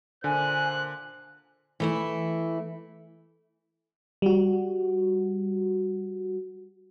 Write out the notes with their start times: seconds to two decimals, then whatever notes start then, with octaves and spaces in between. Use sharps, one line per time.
0.24 A#2 D3 C5 G#5 F#6
1.80 E3 A3 E4
4.22 G3 F#4